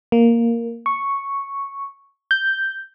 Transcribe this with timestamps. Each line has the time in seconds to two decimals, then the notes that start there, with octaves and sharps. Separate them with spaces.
0.12 A#3
0.86 C#6
2.31 G6